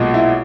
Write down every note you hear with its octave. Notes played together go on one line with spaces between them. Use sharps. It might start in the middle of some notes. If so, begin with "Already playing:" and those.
Already playing: B1 A#2 G#3
E4